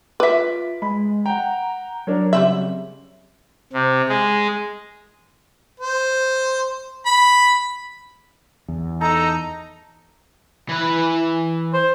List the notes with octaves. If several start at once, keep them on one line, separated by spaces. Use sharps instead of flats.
F4 B4 E5 D6 B6
G#3 B5
F#5 G5 A#5
F#3 D4 A#4 C#5
C#3 G3 C4 E5 F#7
C3
G#3
C5
B5
E2
D#4 A4 A#5
E3 B4
C5